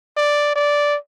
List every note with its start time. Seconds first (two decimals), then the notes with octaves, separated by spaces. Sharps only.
0.17 D5
0.56 D5